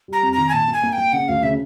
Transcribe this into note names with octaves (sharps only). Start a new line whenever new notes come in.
G3 A#5
F2
D#3 A#5
G#5
A#2 A5
A#3
G#5
A#3
G5
A#3
C#3 F#5
D2 F5
C#3 E5